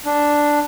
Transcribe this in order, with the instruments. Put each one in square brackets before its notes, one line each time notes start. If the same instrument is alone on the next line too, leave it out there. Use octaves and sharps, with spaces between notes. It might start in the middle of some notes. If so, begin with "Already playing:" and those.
[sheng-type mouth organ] D4